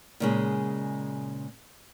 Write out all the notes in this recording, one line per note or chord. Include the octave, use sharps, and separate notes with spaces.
A#2 C#3 G#3